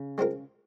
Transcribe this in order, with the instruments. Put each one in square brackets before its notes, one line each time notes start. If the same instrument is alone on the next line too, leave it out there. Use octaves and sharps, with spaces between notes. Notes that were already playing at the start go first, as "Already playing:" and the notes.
Already playing: [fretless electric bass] C#3
[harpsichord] G#3 C4 F4 A#4